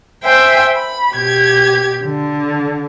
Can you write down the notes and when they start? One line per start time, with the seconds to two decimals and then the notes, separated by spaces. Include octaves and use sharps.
0.24 C5 E5 G5 G#5
0.77 B5
1.13 B2 G4 G#6
2.04 D3